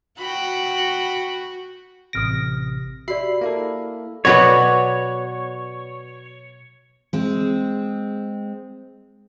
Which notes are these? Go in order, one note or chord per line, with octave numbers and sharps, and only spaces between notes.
F#4 G5 B5
A1 C3 D#6 F6 A#6 D7
F#4 G4 D5 E5 B5 C7
A#3 E4 A4
B2 F#3 B3 F#4 B4 C#5 D5
G#3 C4